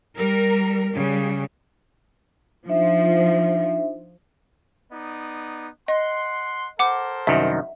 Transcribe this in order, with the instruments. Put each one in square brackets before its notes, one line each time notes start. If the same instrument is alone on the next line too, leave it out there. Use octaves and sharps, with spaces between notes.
[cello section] G3 A#4
C#3 G3
[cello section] F3 [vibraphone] D4 D#4 E5
[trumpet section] B3 D#4 D5
[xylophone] D#5 [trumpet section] F#5 C6
[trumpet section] A4 A#4 C5 [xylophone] F#5 D6
[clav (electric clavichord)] C2 F#2 D#3 [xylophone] E5